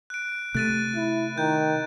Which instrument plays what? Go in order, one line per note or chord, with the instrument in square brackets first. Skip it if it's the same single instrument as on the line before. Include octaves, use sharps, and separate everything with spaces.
[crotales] F#6 D7
[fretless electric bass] C3 A3 [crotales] F#6 A6 D#7
[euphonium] E4
[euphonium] D#3 [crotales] G6